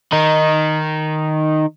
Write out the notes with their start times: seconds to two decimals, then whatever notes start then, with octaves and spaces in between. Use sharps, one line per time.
0.13 D#3 D#4